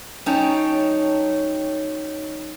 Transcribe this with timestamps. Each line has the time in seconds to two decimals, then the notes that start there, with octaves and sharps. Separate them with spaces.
0.26 F#3 C#4 D#4 C#5 G5 A5